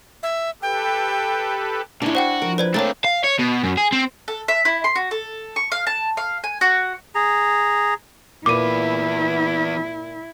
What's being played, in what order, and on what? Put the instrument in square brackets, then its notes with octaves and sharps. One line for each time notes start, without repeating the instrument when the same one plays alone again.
[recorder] E5
[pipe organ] G4 A4 B4 [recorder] G5
[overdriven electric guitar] A#2 C#4 [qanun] D4 E4
[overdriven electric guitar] F#4 [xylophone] C5 F#5 G5
[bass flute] F3 [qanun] A#4
[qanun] B4 [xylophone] C5 D5 G#6
[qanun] A3 A#3 [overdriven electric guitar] C4 D4 [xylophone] C#5 A#5 A6
[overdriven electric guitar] F5
C#5
B2
F#2
G#4
C4
[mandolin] A4
E5
E4
C6
F#4
A4
C#6
F5
A5
F5
G#5
F#4
[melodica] G#4 A#5
[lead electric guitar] E2 B4 [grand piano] A#2 [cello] E4 [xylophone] D6 D#7